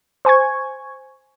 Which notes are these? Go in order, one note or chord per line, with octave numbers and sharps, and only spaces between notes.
C5 G#5 C#6 G#6